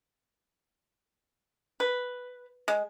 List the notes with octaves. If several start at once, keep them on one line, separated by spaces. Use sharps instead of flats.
B4
G#3